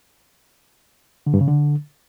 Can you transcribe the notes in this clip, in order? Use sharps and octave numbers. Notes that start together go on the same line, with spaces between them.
D3
G2
C#3
D3